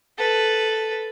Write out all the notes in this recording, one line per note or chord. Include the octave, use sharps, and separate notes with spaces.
A4 B4